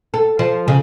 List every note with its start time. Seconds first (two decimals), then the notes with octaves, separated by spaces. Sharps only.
0.14 A4
0.39 F3
0.68 C#3